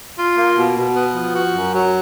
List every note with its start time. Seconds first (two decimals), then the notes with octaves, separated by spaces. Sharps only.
0.17 F4
0.36 A#3
0.56 B2
0.76 B2
0.95 B3
1.15 F3
1.35 F#4
1.54 F#2
1.73 F#3